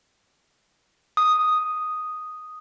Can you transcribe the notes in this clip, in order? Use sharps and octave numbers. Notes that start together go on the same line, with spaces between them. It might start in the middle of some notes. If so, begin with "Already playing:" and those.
D#6